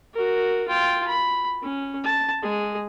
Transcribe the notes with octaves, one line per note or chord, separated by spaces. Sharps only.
F#4 A#4
F4 G5
B5
C#4
A5
G#3 G#4